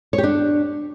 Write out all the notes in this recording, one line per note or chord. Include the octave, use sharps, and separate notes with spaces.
C#5
G4
D4